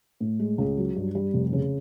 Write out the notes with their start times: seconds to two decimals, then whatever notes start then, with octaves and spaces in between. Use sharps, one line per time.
0.20 A2
0.40 G#3
0.58 C#2
0.77 F#3
0.96 G2
1.15 G3
1.34 F1
1.53 C#3